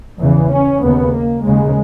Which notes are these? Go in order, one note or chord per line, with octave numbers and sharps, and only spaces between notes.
E2 C#3 E3
C#4
D#2 C#3 B3
A#3
D#2 C#3 G#3